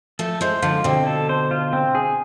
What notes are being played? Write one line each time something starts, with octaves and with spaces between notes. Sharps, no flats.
F3 A3 A4
E3 G#3 C5
D3 F3 F4
B2 D3 C4
A4
C5
F4
C4
G#4